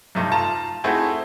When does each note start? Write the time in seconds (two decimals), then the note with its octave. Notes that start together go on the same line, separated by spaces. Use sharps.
0.15 G2 C3 A3 D#4
0.31 F4 A5 A#5
0.84 A3 C4 D#4 E4 F#4 G#4